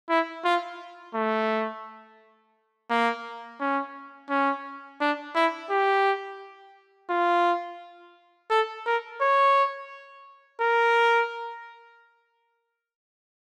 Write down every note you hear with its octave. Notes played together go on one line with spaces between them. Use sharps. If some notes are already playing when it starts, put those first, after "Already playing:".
E4
F4
A3
A#3
C#4
C#4
D4
E4
G4
F4
A4
A#4
C#5
A#4